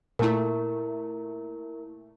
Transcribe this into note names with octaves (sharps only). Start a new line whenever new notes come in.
A#2 A3 E4 A#4